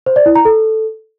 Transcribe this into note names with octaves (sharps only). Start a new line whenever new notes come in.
C5
D5
E4
A#5
A4